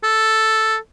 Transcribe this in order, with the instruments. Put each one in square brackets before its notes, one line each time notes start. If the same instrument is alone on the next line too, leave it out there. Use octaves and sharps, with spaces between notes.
[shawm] A4